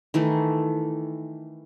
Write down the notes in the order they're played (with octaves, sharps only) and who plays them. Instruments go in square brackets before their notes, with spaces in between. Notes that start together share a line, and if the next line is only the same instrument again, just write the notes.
[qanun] D#3 E3 A3